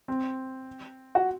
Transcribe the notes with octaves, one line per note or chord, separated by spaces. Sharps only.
C4
F#4